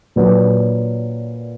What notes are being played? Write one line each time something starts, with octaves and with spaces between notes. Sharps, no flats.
A#2 F#3 D4 F#4 B4